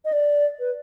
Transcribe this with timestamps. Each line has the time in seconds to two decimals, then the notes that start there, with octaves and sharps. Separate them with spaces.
0.05 D#5
0.13 D5
0.59 B4